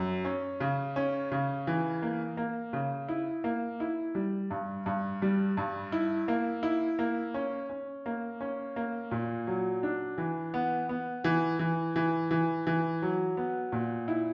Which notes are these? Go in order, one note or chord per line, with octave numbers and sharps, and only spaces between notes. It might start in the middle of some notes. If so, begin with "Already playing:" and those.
Already playing: F#2
C#4
C#3
C#4
C#3
E3
A#3
A#3
C#3
E4
A#3
E4
G3
G2
G2
G3
G2
E4
A#3
E4
A#3
C#4
C#4
A#3
C#4
A#3
A#2
F#3
D4
E3
B3
B3
E3
E3
E3
E3
E3
F#3
B3
A#2
E4